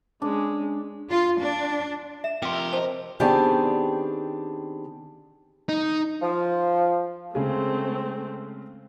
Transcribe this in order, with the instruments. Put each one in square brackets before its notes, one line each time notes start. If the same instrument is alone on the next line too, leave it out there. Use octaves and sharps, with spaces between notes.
[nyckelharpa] G#3 C#4 [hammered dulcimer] D4
[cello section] F4
D4
[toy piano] E5 [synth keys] E7
[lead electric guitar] F2 G4 [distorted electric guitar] A#4 [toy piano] G5 C6 [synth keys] D6 E6
[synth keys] C5 D#5 [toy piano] A5
[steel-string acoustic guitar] D#3 B3 C4 D4 G4 G#4
[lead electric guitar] D#4
[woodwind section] F3
[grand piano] C#3 G#3 [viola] A3 C4